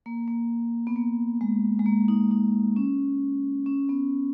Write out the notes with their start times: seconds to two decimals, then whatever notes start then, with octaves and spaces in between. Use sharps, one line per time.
0.06 A#3
0.28 A#3
0.87 B3
0.96 A#3
1.41 G#3
1.79 G#3
1.86 A#3
2.08 D#4
2.31 D#4
2.76 C#4
3.66 C#4
3.89 B3